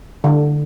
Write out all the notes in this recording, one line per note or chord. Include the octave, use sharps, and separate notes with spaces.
D3